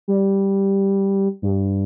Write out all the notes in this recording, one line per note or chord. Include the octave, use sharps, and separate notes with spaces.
G3
G2